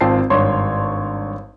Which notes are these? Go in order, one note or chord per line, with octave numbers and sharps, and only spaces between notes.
G#1 C4 F4 G5 A5 C7
G#1 G2 C#5 C6